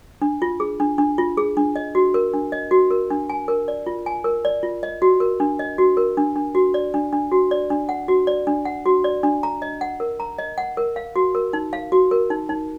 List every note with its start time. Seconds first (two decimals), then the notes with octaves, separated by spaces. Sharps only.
0.22 D4
0.42 F4
0.60 G#4
0.80 D4
0.98 D4
1.18 F4
1.37 G#4
1.57 D4
1.76 D#5
1.95 F#4
2.14 A#4
2.33 D4
2.52 D#5
2.71 F#4
2.91 A#4
3.10 D4
3.30 G#5
3.48 A#4
3.68 D5
3.86 F4
4.06 G#5
4.24 A#4
4.45 D5
4.63 F4
4.83 D#5
5.02 F#4
5.20 A#4
5.40 D4
5.59 D#5
5.78 F#4
5.97 A#4
6.17 D4
6.36 D4
6.55 F#4
6.74 D5
6.94 D4
7.13 D4
7.32 F#4
7.51 D5
7.70 D4
7.89 F#5
8.08 F#4
8.27 D5
8.47 D4
8.65 F#5
8.86 F#4
9.04 D5
9.23 D4
9.43 A#5
9.62 D#5
9.81 F#5
10.00 A#4
10.20 A#5
10.38 D#5
10.58 F#5
10.77 A#4
10.96 F5
11.16 F#4
11.35 A#4
11.53 D#4
11.73 F5
11.92 F#4
12.11 A#4
12.30 D#4
12.49 D#4